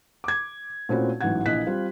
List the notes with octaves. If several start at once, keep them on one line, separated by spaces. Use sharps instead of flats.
D6 G#6
A#2 A3 C4 C#4 E4 F#4
A1 G#2 E3 F#3 F#5 G#6
A#1 E3 A#3 D#5 F#6 B6
G3 C4 F4